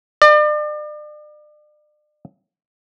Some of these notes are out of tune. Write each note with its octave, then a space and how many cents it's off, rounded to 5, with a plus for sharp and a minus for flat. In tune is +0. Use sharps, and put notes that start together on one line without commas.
D5 +40